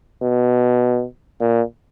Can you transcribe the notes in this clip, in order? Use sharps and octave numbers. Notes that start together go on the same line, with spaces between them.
B2
A#2